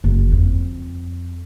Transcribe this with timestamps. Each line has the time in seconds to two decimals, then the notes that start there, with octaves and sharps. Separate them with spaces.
0.04 F#1
0.32 F2